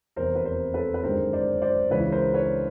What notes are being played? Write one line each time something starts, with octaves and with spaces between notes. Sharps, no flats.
F1 E2 C3 A#4 C5
B4
A#4 C5
A4 B4
B4
G1 F#2 D#3 G#3 A#4 C5
C5 D5
C5 D5
C#2 C#3 E3 G#3 B4 C#5
A#4 C5
B4 C#5